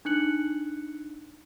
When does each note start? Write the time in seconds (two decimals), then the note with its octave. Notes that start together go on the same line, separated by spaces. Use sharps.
0.05 D4 D#4 F#6 C#7 F#7